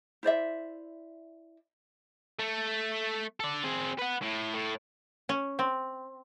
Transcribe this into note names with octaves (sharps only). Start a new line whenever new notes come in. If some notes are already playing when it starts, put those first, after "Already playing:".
E4 C5 D5 E5
A3
A4 D5
C4 G#4
B4 F#5
A2
A2
C#4
C4